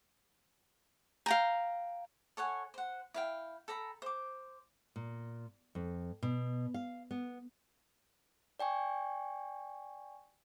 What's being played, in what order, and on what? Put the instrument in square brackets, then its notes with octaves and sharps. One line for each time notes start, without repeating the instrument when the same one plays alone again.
[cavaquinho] F5 G5 A#5
A4 C#5 F#5 G#5
C5 F#5
E4 F5 G5
A4 G5 A#5 B5
C5 D6
[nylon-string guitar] A#2
F2
B2
F5
B3
[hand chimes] D5 G5 G#5 C#6